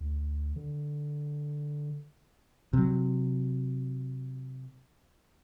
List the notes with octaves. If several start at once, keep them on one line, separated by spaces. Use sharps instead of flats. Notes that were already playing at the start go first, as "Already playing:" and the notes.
D2
D3
C3 F#3